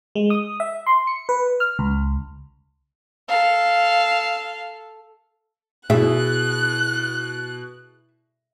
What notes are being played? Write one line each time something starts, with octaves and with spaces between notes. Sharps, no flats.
G#3
D#6
E5
C6
C#7
B4
F6
C#2
A4 F5
B2 E4 G#4 E5 F#6